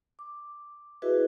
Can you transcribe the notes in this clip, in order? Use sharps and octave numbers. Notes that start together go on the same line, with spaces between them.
D6
E4 F#4 G#4 B4 D#5 E5